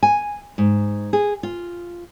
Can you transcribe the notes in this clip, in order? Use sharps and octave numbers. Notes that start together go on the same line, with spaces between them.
G#5
G#2
G#4
F4